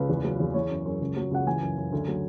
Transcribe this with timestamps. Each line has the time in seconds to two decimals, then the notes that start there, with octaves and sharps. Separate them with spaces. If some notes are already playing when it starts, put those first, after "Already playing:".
Already playing: C#2 B4
0.09 E2
0.24 F#3
0.40 E2
0.54 E3 C#5
0.70 F#2
0.85 F#2
1.01 C#2
1.16 F#3
1.31 C#2 F#5
1.46 E3 G#5
1.61 F#2
1.78 F#2
1.92 D2
2.08 F#3